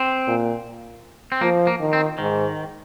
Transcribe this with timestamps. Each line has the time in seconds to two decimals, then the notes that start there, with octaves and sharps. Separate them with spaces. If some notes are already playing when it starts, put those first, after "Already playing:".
Already playing: C4
0.27 A#2
1.32 C4
1.41 F3 A#3
1.67 A#3
1.80 D#3
1.93 C4
2.18 G#2 D#3